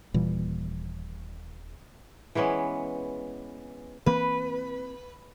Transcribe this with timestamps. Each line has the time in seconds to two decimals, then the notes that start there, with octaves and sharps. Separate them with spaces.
0.14 D#1 A#2 E3 G3
2.35 E3 G#3 B3 C#4
4.06 E3 A#3 C4 B4